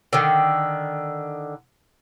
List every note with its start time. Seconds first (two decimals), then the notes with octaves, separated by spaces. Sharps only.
0.13 D3 D#3